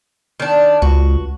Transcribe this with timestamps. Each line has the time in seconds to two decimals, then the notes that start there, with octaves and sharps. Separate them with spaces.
0.40 D#3 D4
0.82 C#2 F#4